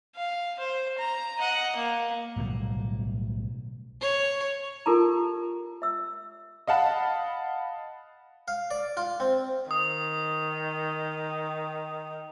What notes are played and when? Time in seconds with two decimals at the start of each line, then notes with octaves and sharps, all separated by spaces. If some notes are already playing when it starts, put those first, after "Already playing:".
0.16 F5
0.59 C5
0.99 A#5
1.39 D#5 F#5
1.76 A#3
2.36 B1 A2 D3 G3
4.01 C#5
4.86 F4 G4 A4 A#4 A5 A#5
5.82 E5 E6
6.67 D#5 F5 F#5 A5 B5
8.48 F5
8.71 D5
8.97 F4
9.20 C4
9.71 D#3 D#6